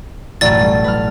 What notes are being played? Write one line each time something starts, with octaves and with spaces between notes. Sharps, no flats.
A1 F#2 B2 D5 A6
G3
B4 F6